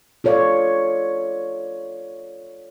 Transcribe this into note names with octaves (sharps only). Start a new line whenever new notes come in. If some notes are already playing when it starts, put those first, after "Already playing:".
F4 A4 C#5 D5 F5